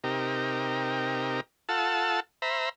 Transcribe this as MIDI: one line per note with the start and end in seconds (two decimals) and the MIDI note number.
0.04 1.41 48
0.04 1.41 63
0.04 1.41 67
0.04 1.41 70
1.69 2.20 65
1.69 2.20 69
1.69 2.20 78
1.69 2.20 81
1.69 2.20 88
2.42 2.69 72
2.42 2.69 76
2.42 2.69 82
2.42 2.69 83